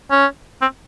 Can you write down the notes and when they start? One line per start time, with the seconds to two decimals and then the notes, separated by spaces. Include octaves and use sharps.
0.11 C#4
0.62 C4